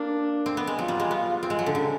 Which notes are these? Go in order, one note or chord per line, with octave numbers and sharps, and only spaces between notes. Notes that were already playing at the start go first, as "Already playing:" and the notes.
Already playing: A#3 D4
C4
B3
G#3
F#3 F4
G3
G#3
B3
C4
G#3
F#3
D3
C#3